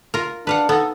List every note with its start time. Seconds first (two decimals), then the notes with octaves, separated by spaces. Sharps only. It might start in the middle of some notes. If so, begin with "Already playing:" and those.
0.14 F4 A#4
0.47 D4 B4 F5 F#5
0.69 B3 D#4 A4